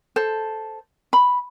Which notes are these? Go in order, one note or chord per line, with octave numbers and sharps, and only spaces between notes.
A4 C5
B5